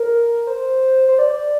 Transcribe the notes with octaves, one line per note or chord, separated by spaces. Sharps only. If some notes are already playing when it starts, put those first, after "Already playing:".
Already playing: A#4
C5
C5
D5
D5